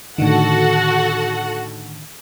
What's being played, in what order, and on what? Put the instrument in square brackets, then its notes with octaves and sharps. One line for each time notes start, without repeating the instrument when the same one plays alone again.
[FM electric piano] A2 D3 D#3 [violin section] F#4 A4 F#5